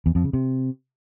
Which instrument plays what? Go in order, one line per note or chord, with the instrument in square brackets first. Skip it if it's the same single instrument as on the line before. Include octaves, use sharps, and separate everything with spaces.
[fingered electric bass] E2
F2
C#3
C3